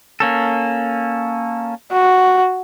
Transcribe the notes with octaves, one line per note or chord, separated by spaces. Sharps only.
A#3 C#4 A4
F#4